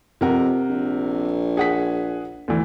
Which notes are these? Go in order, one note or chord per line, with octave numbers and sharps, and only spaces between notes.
F2 C3 A#4 F#5
A#1
G#4 F#5 B6
D2 D3 E3